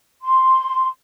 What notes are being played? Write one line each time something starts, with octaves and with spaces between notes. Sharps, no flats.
C6